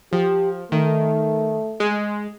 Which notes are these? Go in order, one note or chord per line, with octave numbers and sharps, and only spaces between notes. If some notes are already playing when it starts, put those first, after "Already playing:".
F3 G4
D#3 A3
G#3